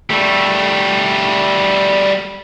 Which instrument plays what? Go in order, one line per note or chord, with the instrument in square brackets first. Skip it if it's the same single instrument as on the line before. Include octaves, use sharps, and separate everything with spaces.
[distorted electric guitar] G3 A3